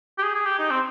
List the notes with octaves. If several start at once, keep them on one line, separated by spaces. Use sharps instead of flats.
G4
G#4
G#4
G4
D#4
C4